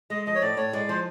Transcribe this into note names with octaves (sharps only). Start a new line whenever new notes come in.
G#3 D#5
F3 D#5
C#5
A2 D5
A2 C#5
G#3 D5
F3 C5